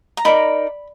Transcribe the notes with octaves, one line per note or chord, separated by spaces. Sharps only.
A#5
D#4 A#4 D5 B5